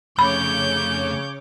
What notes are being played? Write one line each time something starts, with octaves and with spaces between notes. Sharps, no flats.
F2 C#3 A3 C#5 B5 D6 G6